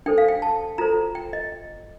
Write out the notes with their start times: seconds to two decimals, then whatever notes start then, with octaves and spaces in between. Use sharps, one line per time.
0.06 D4 A4 C5 G5
0.18 F5
0.28 G5
0.42 A5
0.78 F4 A4 C5 A#5
1.15 G5
1.33 D#5